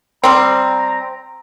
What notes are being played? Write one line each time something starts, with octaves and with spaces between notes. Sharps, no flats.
G3 C4 A#5